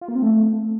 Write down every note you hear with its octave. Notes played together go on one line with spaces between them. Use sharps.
F4
A#3
C4
A3